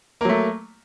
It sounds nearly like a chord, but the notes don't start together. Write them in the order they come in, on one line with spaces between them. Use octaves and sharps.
A#3 F#3 A3